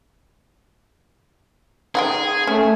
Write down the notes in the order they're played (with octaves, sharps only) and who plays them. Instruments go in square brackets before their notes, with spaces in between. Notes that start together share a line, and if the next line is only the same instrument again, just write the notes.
[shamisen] D#4 F#5 G5 [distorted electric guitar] G#4
[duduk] A3 [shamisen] C#4